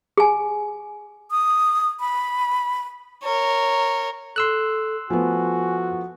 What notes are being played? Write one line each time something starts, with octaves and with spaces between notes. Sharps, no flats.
G#4 G#5
D#6
B5
A#4 C#5
A4 C6 E6 F#6
F3 A3 B3 F#4 G#5